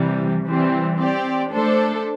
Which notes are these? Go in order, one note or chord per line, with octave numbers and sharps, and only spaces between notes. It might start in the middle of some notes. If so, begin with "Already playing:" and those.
Already playing: C3 E3 G3
E3 G3 C4
C4 G4 D5
A3 D4 A4 C5